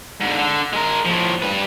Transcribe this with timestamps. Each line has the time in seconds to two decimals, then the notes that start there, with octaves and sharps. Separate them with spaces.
0.20 G#2 D3
0.39 D3
0.73 G#3 A#4
1.05 A2 F3
1.42 G3 B4